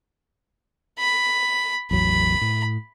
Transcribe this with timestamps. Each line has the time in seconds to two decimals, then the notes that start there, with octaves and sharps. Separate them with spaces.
0.98 B5
1.91 A1 E2 F#3 B5
2.41 A2